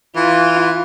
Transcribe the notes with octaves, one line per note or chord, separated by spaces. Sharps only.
E3 F4